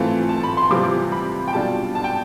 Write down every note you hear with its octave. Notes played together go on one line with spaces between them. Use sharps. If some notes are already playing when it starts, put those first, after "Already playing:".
Already playing: E3 A3 C4 F4 A5
A5
B5
C6
C3 E3 G3 C4 F4 D6
B5
G5
B2 G3 D4 F4 A5
A5
G5